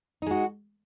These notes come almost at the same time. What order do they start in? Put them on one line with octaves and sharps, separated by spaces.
D#4 G#3 F#4